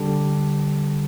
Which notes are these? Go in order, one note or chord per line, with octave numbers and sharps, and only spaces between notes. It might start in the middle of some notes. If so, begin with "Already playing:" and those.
Already playing: D3 G3 D4